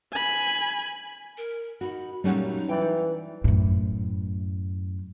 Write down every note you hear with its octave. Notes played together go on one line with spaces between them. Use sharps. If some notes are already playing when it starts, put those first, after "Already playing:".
G#5 B5
A#4
D#4 F#4 B5
A#2 F#3 G3 A3 C#4 D#4 F#4
E3 D5 G5
F#2 A2